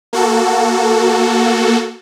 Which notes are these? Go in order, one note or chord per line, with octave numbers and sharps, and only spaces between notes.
A#3 F#4 A4